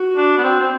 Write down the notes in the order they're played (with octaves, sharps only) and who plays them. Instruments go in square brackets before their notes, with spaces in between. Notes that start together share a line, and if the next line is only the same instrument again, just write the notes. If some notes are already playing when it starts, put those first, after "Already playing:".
Already playing: [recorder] F#4
[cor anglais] D4
B3
C4
C4